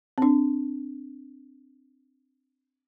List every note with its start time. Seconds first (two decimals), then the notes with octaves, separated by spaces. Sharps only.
0.18 C4 D4